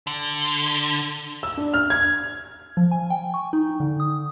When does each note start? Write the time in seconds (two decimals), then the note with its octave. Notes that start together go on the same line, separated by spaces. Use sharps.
0.07 D3
1.43 E6
1.57 D4
1.74 F6
1.90 G#6
2.77 F3
2.92 G#5
3.10 G5
3.34 C#6
3.53 D#4
3.80 D3
4.00 D#6